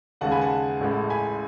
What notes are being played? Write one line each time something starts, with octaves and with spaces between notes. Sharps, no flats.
D#2 C#3 G#3 F#5 A5
G#5 B5
F#5 A5
A1 A2 G#3
G#5 B5